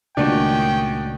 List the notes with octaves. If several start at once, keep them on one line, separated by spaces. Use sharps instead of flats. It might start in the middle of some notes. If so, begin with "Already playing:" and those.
C#2 A#2 D#3 A3 C#4 D4 F#4 G5